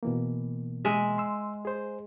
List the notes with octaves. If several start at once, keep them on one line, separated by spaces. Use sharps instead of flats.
B2 E3 A#3
G#3 E5
C6 E6
G#4 C5